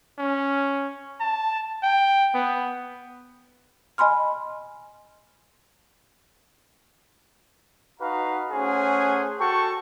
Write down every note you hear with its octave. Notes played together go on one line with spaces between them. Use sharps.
C#4
A5
G5
B3
D#5 G#5 B5 C6 F6
D#4 F#4 B4 F5 A#5
A3 C#4 G#4 C5 F#5 G#5
F#4 A4 G5 A5 C#6